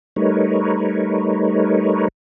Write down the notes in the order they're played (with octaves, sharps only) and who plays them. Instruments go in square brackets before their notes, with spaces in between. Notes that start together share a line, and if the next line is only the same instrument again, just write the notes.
[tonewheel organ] G3 A3 D#4 A#4 B4 C#5